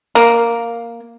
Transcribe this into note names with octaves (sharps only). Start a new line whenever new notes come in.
A#3